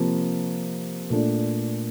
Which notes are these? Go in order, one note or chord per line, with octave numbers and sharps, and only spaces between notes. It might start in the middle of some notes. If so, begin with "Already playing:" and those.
Already playing: C3 F3 A#3
A#2 A3 D4